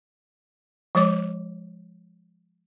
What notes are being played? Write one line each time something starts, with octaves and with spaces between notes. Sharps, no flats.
F3 G#3 C#5 D6